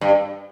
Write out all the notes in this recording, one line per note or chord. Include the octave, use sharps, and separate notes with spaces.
G2